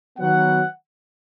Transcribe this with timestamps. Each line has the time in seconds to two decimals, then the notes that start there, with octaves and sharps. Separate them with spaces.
0.18 D#3 F#3 B3 F#5